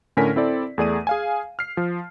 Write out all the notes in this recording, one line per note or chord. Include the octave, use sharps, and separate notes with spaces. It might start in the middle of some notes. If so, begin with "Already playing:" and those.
A2 D3 C#4 A#4 G#5 B6
C4 E4 A4 D5
E2 A3 G#4 D5 D#6 D#7
G#4 F5 G#5
F6 C7
F3